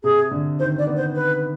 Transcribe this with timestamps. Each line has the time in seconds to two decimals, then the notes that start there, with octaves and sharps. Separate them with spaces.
0.03 C3 G#4
0.31 D3
0.59 D#3 C5
0.78 D5
0.87 B3
0.97 C5
1.15 B4